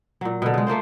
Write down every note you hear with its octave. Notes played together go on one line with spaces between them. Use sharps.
A#2 F#3
B2 D3
C#3 G#3
A3 A#3 F4 C5